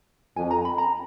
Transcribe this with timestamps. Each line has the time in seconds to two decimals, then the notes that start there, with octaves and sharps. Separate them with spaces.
0.36 F2 G#5
0.51 A#5
0.65 B5
0.78 A#5